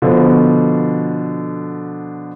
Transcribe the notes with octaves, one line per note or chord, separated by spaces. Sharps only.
B2 D3 F3